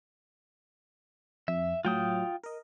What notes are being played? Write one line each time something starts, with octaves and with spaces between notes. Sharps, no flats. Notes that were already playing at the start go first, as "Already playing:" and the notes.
F2 E5
A2 F#3 F4 G5 D#6
A#4 D#5